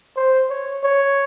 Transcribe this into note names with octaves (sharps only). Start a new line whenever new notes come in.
C5
C#5
C#5